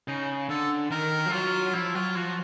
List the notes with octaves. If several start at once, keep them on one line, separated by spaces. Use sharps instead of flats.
C#3 D#4
D3 A4
D#3 A#4
F3
F#3 F4
F3 E4
F#3 F4
F3 F#4